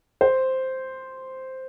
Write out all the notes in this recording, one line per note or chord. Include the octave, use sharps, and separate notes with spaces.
C5